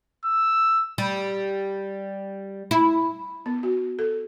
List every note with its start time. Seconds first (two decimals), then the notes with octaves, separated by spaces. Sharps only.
0.25 E6
0.98 G3
2.71 E4
3.46 B3
3.63 F#4
3.99 A4